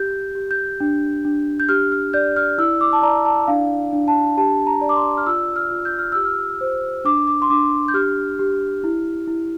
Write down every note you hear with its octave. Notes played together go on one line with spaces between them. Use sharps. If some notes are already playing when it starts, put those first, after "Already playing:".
Already playing: G4 G6
G4
G6
D4
D4
G6
G4 F6
F6
D5 G6
F6
E4 E6
D6
A5
D5 A#5
A5
D4 F5
D4
A5
G4 A5
A#5
D5
D6
C6
F6
F4 E6
F6
F4
G6
F6
G4 E6
F6
C5
D4 D6
D6
C6
D4 D6
G6
G4 F6
G4
E4
E4